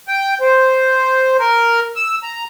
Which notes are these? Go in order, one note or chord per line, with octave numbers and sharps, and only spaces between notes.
G5
C5
A#4
E6
A#5